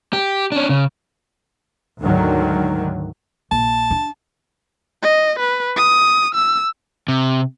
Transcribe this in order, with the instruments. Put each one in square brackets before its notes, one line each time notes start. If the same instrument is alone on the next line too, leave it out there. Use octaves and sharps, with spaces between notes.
[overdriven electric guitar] G4
C#4 D4
C#3
[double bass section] D2 G#2 D3 D#3 F#3
[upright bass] A#1 [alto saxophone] A5
[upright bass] D4
[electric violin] D#5
B4
D#6
E6
[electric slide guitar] C3